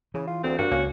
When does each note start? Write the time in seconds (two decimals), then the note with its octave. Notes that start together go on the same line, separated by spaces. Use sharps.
0.14 C#3 E3
0.27 F4
0.44 D2 C4
0.59 G2 A#3 F#4
0.71 C#2 A#3 C#4